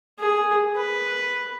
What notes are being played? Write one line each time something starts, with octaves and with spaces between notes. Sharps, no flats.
G#4
B4